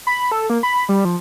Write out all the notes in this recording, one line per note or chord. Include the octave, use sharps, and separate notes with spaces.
B5
A4
A#3
B5
G3
F3